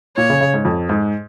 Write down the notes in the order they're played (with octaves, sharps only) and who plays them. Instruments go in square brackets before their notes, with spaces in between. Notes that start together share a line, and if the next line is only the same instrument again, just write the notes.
[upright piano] A#2 [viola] C#5
[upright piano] C#3
C#3
G#2
F2
G#2